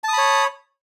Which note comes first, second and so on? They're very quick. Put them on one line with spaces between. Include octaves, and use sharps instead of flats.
A5 D#6 B5 C#5